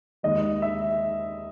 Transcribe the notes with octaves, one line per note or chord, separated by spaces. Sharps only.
D#2 D#3 G#3 D#5
E5